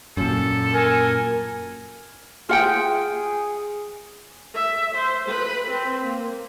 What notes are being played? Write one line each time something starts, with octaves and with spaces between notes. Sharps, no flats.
F#2 A#2 A4
A#4 G#5
F4 G#4 F#5 G5
E5
C5
B4
C4
A#3